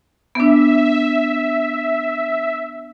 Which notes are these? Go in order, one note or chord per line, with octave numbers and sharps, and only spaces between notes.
B3 D4 E5